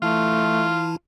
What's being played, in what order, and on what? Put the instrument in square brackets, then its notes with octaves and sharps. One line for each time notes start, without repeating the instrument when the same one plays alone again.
[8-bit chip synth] E3 E4 A5 [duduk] A3 [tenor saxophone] F4